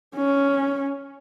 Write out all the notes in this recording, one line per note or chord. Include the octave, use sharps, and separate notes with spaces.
C#4